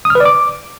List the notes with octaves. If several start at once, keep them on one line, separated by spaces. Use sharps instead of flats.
D#6
F6
B4
D5
D6